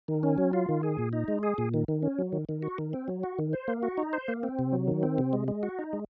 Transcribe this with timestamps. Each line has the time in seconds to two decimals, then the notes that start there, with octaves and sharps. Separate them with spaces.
0.08 D#3
0.23 C#4
0.38 F#3
0.53 F4
0.69 D#3
0.83 G#4
0.98 A#2
1.13 D#4
1.28 G#3
1.43 G#4
1.58 A#2
1.74 D#3
1.88 D#3
2.03 C#4
2.19 F#3
2.33 D#3
2.49 D#3
2.62 F#4
2.78 D#3
2.93 C4
3.08 F#3
3.23 F#4
3.39 D#3
3.53 C5
3.68 A#3
3.83 F#4
3.98 D#4
4.13 C5
4.28 A#3
4.43 C4
4.59 C3
4.72 F#3
4.88 D#3
5.03 C4
5.18 C3
5.33 G#3
5.48 G#3
5.63 F#4
5.79 D#4
5.93 G#3